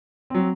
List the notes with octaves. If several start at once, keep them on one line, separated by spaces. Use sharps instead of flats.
F#3 C4